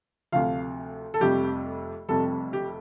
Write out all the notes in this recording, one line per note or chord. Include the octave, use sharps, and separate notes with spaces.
D2 C3 F3 F5
A4
F1 F2 C3 G3 G4
F1 F2 C3 G3 A4
G4